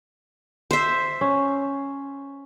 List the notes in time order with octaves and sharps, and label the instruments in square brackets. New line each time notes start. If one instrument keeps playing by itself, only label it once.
[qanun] C5 E5
[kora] C#4